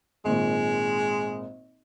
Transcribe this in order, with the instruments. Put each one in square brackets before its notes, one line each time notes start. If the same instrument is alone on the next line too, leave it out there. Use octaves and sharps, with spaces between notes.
[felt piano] G#1 A#2 [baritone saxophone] G#3